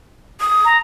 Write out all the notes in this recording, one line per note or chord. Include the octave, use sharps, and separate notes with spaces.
D#6
A#5